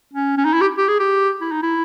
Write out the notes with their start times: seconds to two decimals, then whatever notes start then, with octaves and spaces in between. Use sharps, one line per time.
0.13 C#4
0.37 C#4
0.45 D#4
0.54 E4
0.61 G4
0.77 G4
0.88 G#4
0.99 G4
1.41 E4
1.52 D#4
1.63 E4